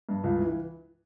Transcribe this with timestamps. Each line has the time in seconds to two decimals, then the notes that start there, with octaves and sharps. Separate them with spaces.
0.09 G2
0.24 C#2
0.39 E3